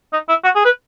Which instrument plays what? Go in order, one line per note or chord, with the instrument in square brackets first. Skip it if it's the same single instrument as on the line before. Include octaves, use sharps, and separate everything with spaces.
[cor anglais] D#4
E4
F#4
G#4
B4